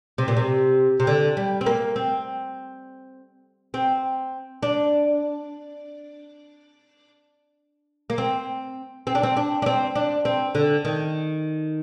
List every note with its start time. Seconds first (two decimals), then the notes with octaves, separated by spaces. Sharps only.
0.18 C3
0.28 A#2
0.37 C3
1.00 C3
1.07 D3
1.37 G3
1.61 C4
1.66 A#3
1.96 C4
3.74 C4
4.63 D4
8.10 A#3
8.18 C4
9.07 C4
9.15 D4
9.23 C4
9.37 D4
9.62 D4
9.66 C4
9.95 D4
10.25 C4
10.55 D3
10.85 D#3